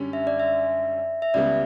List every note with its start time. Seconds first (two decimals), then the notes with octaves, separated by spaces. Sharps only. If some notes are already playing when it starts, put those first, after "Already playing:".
Already playing: F#2 D3 G3 C#4
0.13 E5
0.27 D5
0.40 E5
1.22 E5
1.34 C#2 C#3 G3 B3 D5